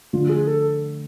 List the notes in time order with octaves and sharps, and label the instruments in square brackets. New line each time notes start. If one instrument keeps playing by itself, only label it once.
[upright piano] D3 F3 A3 [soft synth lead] F4
[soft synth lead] G#4
A4